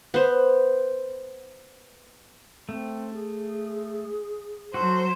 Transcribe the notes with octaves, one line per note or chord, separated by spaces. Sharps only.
B3 C5
A3 C4
G#4
F#3 F#4 A4 C5